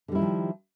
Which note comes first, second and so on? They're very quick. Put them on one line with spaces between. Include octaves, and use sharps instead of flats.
D3 G3 E4 D#3 F3